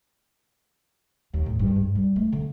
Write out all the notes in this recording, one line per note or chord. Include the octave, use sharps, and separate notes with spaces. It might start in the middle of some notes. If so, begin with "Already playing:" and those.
D#2
A2
G2
G#2
G3
A3
D3